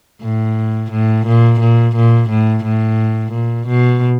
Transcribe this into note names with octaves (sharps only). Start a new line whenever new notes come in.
A2
A2
A#2
A#2
A#2
A2
A2
A#2
B2